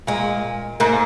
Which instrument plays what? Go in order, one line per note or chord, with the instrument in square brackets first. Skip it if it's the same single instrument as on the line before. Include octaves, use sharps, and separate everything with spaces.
[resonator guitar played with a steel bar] A#2 [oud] G#3
[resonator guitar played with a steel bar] G#2 [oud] A#3